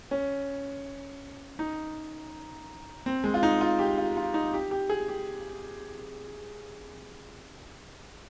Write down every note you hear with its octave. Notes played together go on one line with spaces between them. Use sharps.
C#4
D#4
C4
G#3
F4
D#4
F4
G4
F4
F4
D#4
G4
G4
G#4
G4